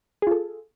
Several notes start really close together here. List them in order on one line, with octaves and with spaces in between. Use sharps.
G#4 F4 A4